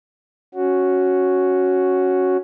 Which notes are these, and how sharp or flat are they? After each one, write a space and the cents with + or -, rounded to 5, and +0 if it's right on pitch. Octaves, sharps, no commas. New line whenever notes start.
C#4 +0 F#4 +0